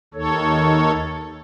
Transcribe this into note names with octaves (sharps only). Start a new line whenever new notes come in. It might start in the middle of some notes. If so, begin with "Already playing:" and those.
D#2 D#3 A4 C#5